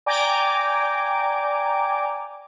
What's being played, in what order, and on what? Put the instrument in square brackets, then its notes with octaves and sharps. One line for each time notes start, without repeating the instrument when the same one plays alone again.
[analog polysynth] D5 G5 G#5 A#5 D6